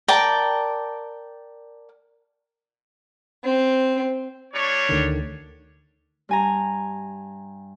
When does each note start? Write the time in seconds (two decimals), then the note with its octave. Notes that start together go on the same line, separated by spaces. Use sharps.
0.08 A#4 D5 G5 A5
3.42 C4
4.54 G3 D4 C#5
4.89 D2 D3 D#3
6.29 G2 G#5 A#5